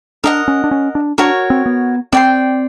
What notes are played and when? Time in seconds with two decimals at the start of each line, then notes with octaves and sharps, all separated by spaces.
0.24 D4 A#4 D#5 F#5
0.48 C#4
0.64 D4
0.71 C#4
0.95 D4
1.18 D4 F#4 A#4 C#5
1.50 C4
1.66 B3
2.12 C4 D5 G5 C6